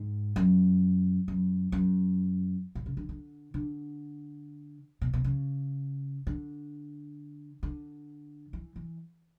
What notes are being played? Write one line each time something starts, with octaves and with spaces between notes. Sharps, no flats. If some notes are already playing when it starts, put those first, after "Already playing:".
Already playing: G#2
F#2
F#2
F#2
A2
C#3
D3
D3
D3
B2
B2
C#3
D3
D3
E3
E3